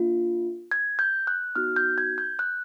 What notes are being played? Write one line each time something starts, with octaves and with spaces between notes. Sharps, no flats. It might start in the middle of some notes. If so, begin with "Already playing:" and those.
Already playing: A#3 D4 F4
G#6
G6
F#6
B3 D#4 F#4 F6
G6
G#6
G6
F#6